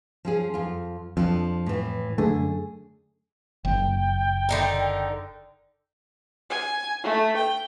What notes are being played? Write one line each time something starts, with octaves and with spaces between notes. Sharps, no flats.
F3 C#4 G#4
F2 F4
F2 F3 D4
A2 E3
F#2 D3 A3 G#4
F#1 G5
D3 D#4 A#4
G#5
A3
G5